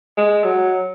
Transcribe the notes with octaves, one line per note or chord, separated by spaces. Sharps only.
G#3
F#3